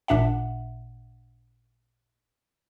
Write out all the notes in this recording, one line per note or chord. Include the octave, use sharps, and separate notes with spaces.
A1 A#2 D4 E5 F#5